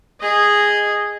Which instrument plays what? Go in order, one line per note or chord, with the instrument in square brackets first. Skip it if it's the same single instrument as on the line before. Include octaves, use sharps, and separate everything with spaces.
[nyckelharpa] G#4 D#5